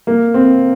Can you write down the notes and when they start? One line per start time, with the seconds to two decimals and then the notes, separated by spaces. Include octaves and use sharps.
0.07 A#3
0.34 C4